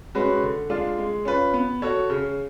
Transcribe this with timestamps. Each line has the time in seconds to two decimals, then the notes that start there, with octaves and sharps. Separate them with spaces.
0.15 G#3 C#4 F#4 B4
0.42 D3
0.70 G#3 D4 F4
0.98 G#3
1.25 C#4 F4 B4
1.54 B3
1.82 F#4 A4 C#5
2.10 C#3